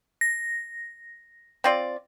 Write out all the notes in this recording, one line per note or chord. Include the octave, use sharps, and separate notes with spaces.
A#6
C4 F4 D5